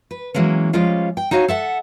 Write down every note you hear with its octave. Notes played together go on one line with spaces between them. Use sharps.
B4
E3 F#3 G#3 A#3 C#4
F3 G3 G#3 C#4 F4 F5
G5
D#4 F#4 C#5 F5 G#5
A4 E5 F#5